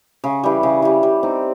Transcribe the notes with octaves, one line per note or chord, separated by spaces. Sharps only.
C#3
E3 G3
C#3
E3 G3
G3
C4 D#4